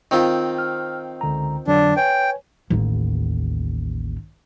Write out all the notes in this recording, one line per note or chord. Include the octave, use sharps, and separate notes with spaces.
D#3 C4 F4
F6
C#2 D3 A#5
F2 D3 F#3 D4
B4 C#5 G5 G#5
A1 D#2